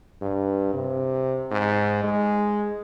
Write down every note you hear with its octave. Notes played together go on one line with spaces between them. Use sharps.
G2
C3
G#2
G#3